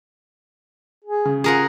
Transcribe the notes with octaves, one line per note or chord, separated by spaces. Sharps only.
G#4
C#3
F4 G#4 A#4 F#5